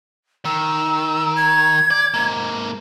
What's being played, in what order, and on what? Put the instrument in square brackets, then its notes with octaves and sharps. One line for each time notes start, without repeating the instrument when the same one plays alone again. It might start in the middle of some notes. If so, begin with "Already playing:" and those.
[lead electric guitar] D#3 [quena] E6
[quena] G#6
[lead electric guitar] D5
G#2 A#3